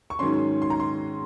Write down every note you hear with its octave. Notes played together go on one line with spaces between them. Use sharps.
C#6
G#2 D#3 F#3 C#4 C6
C6
A#5
C6